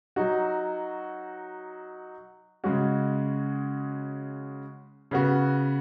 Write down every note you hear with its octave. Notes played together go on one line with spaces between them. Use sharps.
F#3 D#4 F#4
C#3 G#3 C#4 F#4
C#3 B3 F#4